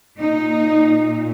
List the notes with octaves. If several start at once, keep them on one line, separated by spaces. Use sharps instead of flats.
A#2 D#4